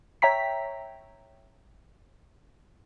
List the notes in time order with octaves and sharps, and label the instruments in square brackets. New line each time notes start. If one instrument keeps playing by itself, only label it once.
[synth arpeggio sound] C#5 E5 G5 A#5 B6